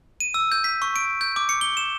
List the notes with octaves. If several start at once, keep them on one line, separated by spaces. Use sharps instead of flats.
D#7
E6
G6
B6
C#6
D7
G6
D6
C#7
G7
E7